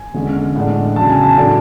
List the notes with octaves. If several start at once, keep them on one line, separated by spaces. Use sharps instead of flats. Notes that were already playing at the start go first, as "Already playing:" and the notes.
Already playing: G#5
E2 D3 G#3 C#4
A2 G#3 D4 F#5
E2 C#3 F#3 A5
G#5
A5
A2 F#3 A3 D4